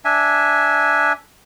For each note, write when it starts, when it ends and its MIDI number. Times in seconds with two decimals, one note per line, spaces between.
0.05 1.12 62
0.05 1.12 76
0.05 1.12 80